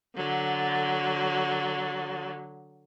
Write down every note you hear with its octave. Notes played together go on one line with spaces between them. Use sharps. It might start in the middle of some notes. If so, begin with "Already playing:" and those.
D3 F#3